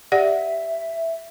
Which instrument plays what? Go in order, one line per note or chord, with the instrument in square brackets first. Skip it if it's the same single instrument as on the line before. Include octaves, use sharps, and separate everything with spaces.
[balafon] G4 D5 F#5 [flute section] E5